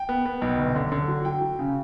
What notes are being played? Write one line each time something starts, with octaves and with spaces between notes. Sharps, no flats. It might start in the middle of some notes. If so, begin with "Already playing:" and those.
Already playing: G5
B3
B3
B1
G1
D3
D3
F#3
F#3 G5
F#3
C#3